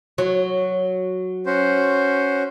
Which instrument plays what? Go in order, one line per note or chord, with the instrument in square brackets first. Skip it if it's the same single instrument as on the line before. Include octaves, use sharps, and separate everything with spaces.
[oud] F#3
[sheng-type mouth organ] C#4 F#4 C5